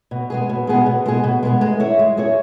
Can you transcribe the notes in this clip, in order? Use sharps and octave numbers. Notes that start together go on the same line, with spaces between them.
B2
G#3 B3 G#4
B2
G#3 B3 G#4
B2
G#3 B3 G#4
B2
G#3 B3 G#4
G#3
E4 G#4 C#5
G#3
E4 G#4 C#5